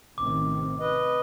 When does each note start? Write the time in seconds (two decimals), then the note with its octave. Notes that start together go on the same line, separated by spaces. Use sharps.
0.18 A1 C3 D#3 D6
0.80 B4 D#5